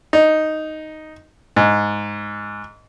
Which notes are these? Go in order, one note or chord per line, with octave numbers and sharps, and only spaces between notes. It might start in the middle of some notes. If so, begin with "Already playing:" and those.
D#4
G#2